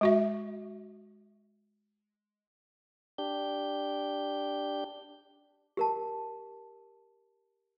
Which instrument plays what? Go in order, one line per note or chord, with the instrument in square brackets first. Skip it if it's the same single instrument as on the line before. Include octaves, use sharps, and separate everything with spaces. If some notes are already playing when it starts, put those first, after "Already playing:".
[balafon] G#3 F#4 E5
[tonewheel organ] D4 G4 G6
[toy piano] G4 A#4 A5